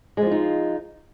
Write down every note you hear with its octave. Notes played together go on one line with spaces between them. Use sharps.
F3 G#3 D#4 F4